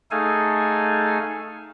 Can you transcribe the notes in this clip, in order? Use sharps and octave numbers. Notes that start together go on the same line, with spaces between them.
A3 D#4 G#4 A4 F5 G#5